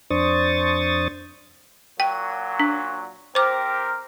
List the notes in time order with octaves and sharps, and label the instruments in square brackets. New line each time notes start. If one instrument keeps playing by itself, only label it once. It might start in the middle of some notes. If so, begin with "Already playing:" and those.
[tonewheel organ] F2 D4 C5 C#6 D#6 A6
[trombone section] A#2 F#3 [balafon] G5
[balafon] D4
[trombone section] C4 G4 A#4 [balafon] C5 D6